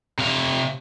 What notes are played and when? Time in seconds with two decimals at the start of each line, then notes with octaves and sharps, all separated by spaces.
0.19 C3 F5